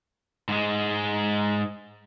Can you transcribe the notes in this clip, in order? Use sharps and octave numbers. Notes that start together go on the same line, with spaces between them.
G#2 G#3